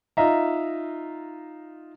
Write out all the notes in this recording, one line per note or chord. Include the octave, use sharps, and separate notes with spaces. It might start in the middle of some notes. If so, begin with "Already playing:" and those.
D#4 F4 D#5 E5 A#5